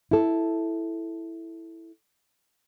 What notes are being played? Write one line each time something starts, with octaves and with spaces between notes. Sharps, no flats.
E4 A4